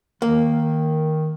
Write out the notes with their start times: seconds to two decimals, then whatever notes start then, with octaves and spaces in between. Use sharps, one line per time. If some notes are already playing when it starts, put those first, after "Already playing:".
0.22 D#3 A#3